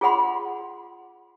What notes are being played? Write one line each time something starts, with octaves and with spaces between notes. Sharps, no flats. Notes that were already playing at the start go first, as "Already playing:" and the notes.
F4 G#4 C#5 F#5 B5 C6